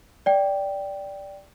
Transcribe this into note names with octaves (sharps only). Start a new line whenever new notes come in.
D5 G5